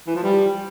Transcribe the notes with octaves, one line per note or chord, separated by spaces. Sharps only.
E3
F3
G3